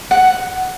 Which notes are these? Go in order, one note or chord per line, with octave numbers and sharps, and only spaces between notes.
F#5